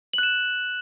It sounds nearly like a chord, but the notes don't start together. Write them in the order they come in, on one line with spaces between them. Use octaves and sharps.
F#7 F#6 E7